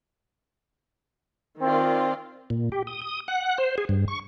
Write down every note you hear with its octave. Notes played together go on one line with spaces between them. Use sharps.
D#3 C4 F4 D5
A#2
G4
D#6
D#6
F#5
C5
G#4
G2
C#6